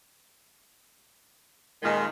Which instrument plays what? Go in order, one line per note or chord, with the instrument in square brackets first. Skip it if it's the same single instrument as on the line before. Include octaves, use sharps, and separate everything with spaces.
[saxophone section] F2 A#2 D#3 [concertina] G#3